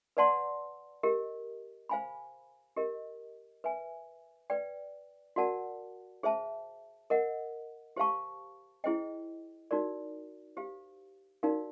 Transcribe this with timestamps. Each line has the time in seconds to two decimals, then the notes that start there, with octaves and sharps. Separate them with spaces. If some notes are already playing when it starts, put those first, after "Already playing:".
0.17 B4 D5 F#5 A5 C6
1.03 G4 A#4 D#5
1.89 C5 F5 G#5 B5
2.77 G4 A#4 D#5
3.64 B4 E5 G#5
4.50 B4 D5 G5
5.36 F#4 A#4 D5 F#5 A5
6.23 G#4 C5 E5 A5
7.10 A#4 D#5 F#5
7.96 G4 C5 F5 A5 C#6
8.84 E4 G#4 C5 D#5 G5
9.71 D#4 F#4 A#4 D5
10.57 G4 C5 F5
11.43 D#4 F#4 A#4 D5 F5